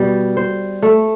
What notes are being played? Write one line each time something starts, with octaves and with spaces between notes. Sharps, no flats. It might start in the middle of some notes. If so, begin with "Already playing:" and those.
Already playing: B2 G3
C5
A3